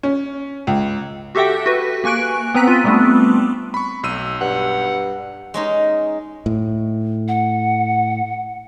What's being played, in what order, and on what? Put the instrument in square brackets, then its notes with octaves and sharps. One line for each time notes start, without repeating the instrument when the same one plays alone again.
[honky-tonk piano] C#4
C#2
[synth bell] F#4 G4 A4 E5 F#5 G5
F#4 B4
A#3 G#5 C#6 F#6 D7
B3 C4 B4 A#5 F#6 B6
F4 D#7
G3 A3 B3 C4 D4
[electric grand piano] B5 C#6
B1 E6 D#7
[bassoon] G2 [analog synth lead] F#5
[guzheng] G#3 C#4 D#4
[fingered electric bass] A2
[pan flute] F#5